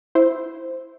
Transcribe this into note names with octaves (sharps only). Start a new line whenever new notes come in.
E4 C5